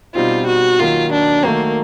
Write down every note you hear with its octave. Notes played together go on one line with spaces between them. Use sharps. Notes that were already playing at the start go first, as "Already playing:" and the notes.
B2 G3 C4 D#4 F4
F#4
D#3 F#3 A#3 F4
D4
D#3 F#3 A3 A#3